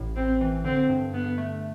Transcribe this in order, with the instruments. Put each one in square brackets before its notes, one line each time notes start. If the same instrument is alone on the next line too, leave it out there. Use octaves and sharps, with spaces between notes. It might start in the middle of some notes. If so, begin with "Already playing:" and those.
Already playing: [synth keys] A1 A2
[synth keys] A2 [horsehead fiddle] C4
[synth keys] E3
[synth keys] D3 [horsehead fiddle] C4
[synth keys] G2
[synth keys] G2 [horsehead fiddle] B3
[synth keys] A3